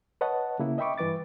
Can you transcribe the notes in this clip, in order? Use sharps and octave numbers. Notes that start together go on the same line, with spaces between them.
B4 C#5 D#5 F#5 A5
C#3 A#3 E4
D#5 E5 G5 B5 C#6 D6
G2 E3 B4 D6 A6